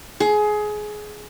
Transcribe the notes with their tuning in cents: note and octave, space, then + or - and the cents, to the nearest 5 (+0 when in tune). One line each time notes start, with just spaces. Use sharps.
G#4 +20